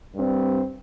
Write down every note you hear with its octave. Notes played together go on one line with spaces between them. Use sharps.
G2 G3 C4